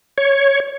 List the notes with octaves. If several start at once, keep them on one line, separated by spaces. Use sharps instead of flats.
C#5